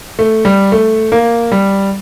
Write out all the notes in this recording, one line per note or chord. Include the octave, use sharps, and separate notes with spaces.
A3
G3
A3
A#3
G3